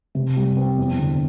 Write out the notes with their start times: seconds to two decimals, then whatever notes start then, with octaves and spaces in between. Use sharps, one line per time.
0.15 C3
0.37 G3
0.57 C4
0.78 E2
0.99 D3